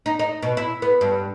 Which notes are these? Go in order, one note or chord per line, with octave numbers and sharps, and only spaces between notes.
D#4
D#4
B2
E4
B3
G2